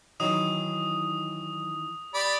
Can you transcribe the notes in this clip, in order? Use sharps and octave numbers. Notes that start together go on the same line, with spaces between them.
D#3 E3 F#3 D#4 D#6
G4 D5 B5